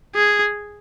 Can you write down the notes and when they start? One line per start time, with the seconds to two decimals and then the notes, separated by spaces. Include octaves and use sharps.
0.15 G#4